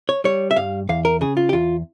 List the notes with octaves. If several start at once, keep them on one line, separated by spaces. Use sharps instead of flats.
C#5
G3 C#5
E5
G2 F5
E2 F5
A#4
C#3 G#4
F4
G4
E2 F4